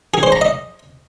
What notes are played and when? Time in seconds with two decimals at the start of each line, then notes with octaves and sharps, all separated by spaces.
0.14 G#4
0.23 C5
0.32 A#5
0.41 D#5